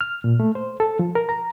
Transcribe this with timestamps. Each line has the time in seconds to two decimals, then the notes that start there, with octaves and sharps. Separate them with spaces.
0.01 F6
0.24 A#2
0.40 A3
0.55 C5
0.80 A4
0.99 F3
1.15 A#4
1.29 A#5